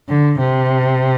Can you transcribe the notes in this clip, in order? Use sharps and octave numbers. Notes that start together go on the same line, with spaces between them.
D3
C3